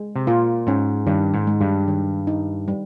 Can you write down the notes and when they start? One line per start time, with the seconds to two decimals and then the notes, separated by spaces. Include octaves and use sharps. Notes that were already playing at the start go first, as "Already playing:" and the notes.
Already playing: G#3
0.16 C3
0.27 A#2 F4
0.67 G#2 C#4
1.07 G2 D#3
1.34 G#2
1.47 G#3
1.61 G2
1.88 D#3
2.27 D#4
2.68 G3